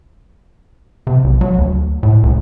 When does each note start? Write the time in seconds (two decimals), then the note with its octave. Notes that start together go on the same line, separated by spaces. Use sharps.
1.07 C3
1.24 B1
1.41 F#3
1.58 D2
2.03 A2
2.23 C#2